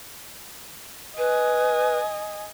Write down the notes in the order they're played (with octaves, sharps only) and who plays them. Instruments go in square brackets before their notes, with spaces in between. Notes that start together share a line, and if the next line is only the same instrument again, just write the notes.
[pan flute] B4 [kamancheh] D#5 G#5